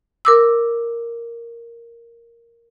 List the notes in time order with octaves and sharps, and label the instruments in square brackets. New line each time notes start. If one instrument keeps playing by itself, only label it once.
[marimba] A#4 D6 E6